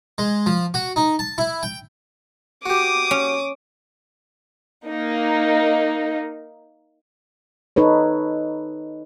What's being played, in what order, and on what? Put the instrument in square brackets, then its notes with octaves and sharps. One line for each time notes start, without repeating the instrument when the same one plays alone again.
[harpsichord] G#3
F3
F#4
D#4
A5
E4
G5
[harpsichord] F#4 G4 [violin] D6 D#6
[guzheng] C#4
[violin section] A#3 D#4
[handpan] D#4 A4 B4 C#5